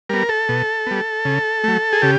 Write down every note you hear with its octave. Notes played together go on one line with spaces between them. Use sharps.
G3 B3 A#4
A4
B2
G3 B3
C#3
F#3 A3
G#4
C#3 G4